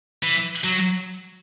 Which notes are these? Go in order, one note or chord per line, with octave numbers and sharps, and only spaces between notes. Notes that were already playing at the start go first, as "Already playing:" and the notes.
E3
F#3